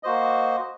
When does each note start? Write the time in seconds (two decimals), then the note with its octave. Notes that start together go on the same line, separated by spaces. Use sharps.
0.03 A#3 F#4 C5 D#5